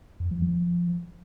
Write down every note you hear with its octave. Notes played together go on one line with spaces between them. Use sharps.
F2
F3
F3